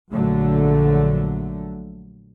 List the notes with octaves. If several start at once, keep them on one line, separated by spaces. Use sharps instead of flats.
A#1 D3 F#3 A3